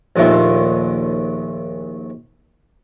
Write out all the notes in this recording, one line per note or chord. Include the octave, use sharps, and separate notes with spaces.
A#1 D#2 A#2 A3 F4